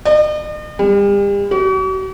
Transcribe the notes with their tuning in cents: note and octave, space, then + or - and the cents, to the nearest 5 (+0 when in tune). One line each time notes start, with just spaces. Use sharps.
D#5 -45
G3 +40
F#4 +45